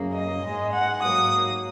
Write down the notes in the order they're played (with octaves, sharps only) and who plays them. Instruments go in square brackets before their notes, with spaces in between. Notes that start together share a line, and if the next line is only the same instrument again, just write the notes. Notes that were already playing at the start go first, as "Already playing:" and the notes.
Already playing: [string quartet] F#2 C#3 A#3
D#5
G#2 G#3
F#5
G#2 F#3 A#3 D#6